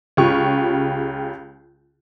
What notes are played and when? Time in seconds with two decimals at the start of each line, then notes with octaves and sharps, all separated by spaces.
0.17 C#2 C#3 F4 G4 C#6